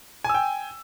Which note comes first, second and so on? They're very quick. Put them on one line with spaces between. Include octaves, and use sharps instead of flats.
G#5 E6 G5